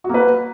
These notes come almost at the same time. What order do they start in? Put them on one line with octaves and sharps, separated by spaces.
F#4 A#3 B4